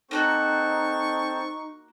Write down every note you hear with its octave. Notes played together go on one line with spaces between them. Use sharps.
A#3 C4 D4 D#4 F#4 A4 C5 C#6